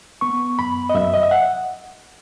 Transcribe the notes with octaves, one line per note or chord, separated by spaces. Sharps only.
B3 C#6
F#2 B5
D#5
F#2 E5
D#5
E5
F#5